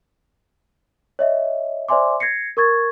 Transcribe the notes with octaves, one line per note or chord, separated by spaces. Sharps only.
C#5 D#5 E5
C5 D5 E5 G#5 C6 D6
G#6 A#6 C7 C#7
A#4 C#6 G#6 A6